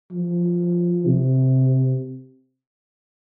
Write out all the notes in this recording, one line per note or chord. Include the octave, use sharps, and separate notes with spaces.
F3
C3